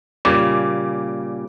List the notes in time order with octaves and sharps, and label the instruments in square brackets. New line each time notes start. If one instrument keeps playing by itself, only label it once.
[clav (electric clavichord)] A#2 C#3 G3 [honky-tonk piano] D6